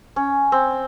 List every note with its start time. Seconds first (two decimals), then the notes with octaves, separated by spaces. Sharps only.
0.16 C#4
0.52 C4